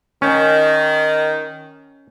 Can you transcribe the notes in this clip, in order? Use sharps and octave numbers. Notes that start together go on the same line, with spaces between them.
D#3 C#4